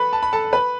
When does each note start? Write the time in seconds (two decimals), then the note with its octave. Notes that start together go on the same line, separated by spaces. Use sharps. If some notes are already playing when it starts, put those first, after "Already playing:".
Already playing: A4 B4 B5
0.13 A5
0.23 B5
0.33 A4 A5
0.53 B4 B5